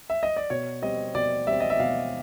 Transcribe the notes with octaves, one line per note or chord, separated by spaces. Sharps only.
E5
D#5
D5
B2 C#5
G3 C4 D#5
B2 D5
G3 C4 E5
D#5
E5
B2 F5